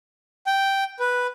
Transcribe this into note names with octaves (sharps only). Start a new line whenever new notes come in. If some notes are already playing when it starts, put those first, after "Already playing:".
G5
B4